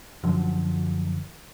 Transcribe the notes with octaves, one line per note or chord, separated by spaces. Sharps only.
F#2 D3 F3 F#3